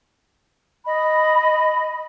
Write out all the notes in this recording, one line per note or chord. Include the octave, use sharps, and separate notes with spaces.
D#5 B5